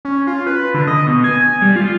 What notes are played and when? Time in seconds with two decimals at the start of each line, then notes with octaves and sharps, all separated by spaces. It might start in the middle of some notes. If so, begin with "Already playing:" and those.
0.05 C#4
0.27 F4
0.47 B4
0.74 D3
0.87 D#5
1.07 B2
1.24 G#5
1.62 G3
1.76 F4